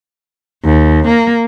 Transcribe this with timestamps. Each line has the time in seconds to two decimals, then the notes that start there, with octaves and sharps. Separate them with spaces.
0.65 D#2
1.08 A#3